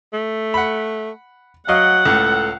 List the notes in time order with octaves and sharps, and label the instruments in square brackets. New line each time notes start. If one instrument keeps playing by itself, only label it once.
[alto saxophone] A3
[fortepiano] F#5 B5
[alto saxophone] F#3 [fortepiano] D#5 F5 [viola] F#5
[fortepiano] C#2 A2 [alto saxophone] A4